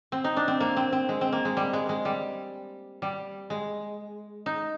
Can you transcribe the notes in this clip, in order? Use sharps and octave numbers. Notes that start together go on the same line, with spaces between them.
C4
D#4
D4
C4
A#3
C4
C4
G#3
C4
A#3
G#3
G3
G#3
G#3
G3
G3
G#3
D#4